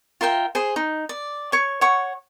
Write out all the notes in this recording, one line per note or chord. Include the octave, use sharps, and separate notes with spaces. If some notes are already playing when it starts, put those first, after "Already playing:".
F4 A#4 E5 G5
G#4 C5
D#4
D5
C#5 C#6
C#5 F#5 C#6